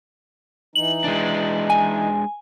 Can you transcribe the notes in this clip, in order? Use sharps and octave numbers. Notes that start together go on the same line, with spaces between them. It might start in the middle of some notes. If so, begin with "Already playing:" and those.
E3 D#4 F#7
G#3 D4
G#5